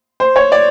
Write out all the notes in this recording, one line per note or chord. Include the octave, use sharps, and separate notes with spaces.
C5
C#5
D5